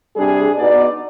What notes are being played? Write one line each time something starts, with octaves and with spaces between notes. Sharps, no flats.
C3 G3 D4 G#4
B2 B3 D#4 D5